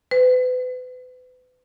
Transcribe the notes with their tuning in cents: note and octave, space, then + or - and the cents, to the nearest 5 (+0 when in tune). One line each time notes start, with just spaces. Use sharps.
B4 +35